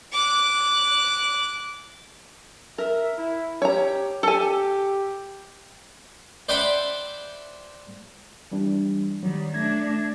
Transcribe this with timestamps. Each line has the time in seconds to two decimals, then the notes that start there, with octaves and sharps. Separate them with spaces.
0.12 D6 F#6
2.78 A#4 E5
3.18 E4
3.62 G4 C#5 A#5
4.23 G4 A4 G#5
6.49 C5 D5 E5 F#5 G5 B5
8.51 E3 G3 D4
9.23 D#3 F#3 G3
9.54 A3 D4 G#6 A#6